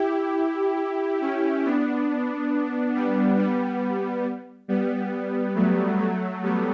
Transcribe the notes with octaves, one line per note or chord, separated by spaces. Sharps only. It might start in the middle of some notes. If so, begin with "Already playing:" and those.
Already playing: E4 G4
C#4 E4
B3 D4
G3 B3
G3 B3
G3 B3
F#3 A3
F#3 A3
G3 B3